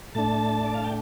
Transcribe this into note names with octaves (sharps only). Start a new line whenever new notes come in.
A2 A3 D4 A5
D5
F5
G5